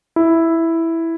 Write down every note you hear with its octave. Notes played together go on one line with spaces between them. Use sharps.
E4